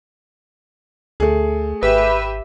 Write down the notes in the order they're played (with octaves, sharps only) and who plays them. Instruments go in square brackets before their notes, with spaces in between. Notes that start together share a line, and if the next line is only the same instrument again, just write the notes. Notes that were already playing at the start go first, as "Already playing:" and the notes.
[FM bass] D2 [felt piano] A3 G#4
[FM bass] G#1 [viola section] G4 E5 [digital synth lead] B4